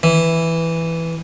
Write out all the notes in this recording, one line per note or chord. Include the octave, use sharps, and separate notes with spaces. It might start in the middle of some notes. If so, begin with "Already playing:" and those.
E3